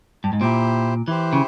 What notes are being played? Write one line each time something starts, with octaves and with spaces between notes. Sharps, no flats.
G2
G#2
A#2 E4 G4 C5
E3 E4 G4 C5
C#3